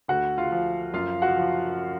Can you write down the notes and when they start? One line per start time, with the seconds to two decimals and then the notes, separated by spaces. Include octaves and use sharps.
0.08 D2 F#4 F#5
0.38 F4 F5
0.52 F3
0.94 F#2 F4 F5
1.22 F#4 F#5
1.36 F3